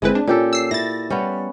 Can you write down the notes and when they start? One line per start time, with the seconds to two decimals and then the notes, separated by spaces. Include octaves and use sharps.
0.02 G1 G#3 C4 E4 B4
0.15 D4
0.27 A#2 C#4 G4 A4
0.53 E6 C7
0.71 E4 A6 A#6
1.10 G3 B3 C#4